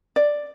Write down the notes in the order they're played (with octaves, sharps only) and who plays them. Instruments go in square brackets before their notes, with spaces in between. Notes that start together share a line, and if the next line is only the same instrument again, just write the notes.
[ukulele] D5